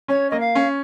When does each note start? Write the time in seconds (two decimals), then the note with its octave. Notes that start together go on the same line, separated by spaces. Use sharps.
0.08 C#4 C#5
0.31 A#3 D#5
0.40 F5
0.55 C#4